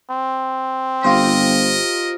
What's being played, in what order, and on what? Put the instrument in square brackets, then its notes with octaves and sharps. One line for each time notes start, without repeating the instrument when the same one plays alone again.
[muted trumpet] C4
[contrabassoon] G1 [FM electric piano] F4 G4 C5 [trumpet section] A#4 D#5